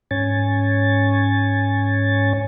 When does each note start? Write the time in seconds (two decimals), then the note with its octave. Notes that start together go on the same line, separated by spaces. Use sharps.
0.11 G#2 C#4 C#5 G#5 A6